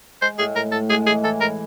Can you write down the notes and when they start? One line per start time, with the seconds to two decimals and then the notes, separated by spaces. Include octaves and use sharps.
0.22 G#3 C5
0.39 A2 G#4
0.55 A2 A#4
0.72 A2 A4
0.90 G#3 G#4
1.07 E3 G#4
1.24 E3 A4
1.40 G#3 A#4